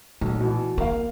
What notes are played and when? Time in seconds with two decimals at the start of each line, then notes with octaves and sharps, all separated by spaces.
0.21 B1 A#2
0.41 B2 E3
0.78 A#3 A#4 F5